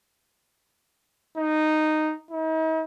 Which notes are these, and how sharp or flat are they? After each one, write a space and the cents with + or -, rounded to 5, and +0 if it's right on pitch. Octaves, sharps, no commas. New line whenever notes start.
D#4 -10
D#4 +45